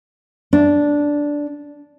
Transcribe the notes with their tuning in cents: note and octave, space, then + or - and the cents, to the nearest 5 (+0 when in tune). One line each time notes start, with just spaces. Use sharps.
D4 -5